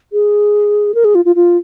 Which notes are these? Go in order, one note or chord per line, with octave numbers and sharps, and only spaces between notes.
G#4
A#4
G#4
F4
F4
F4